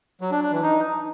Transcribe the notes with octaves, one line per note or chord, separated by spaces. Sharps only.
F#3
D4
D4
E3
D#4